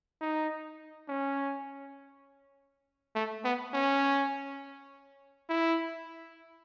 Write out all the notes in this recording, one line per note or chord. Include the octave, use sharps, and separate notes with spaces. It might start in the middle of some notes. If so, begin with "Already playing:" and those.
D#4
C#4
A3
B3
C#4
E4